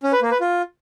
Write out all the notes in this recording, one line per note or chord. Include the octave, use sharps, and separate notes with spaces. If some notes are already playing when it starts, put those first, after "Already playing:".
C#4
B4
A#3
B4
F4